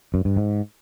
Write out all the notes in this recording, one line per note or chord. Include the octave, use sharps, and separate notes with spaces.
F#2
G2
G#2